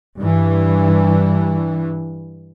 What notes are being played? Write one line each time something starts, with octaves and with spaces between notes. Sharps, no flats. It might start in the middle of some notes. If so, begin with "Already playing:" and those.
G2 E3